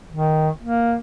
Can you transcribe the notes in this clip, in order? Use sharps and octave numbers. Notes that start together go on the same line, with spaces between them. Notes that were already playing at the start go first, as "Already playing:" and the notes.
D#3
A#3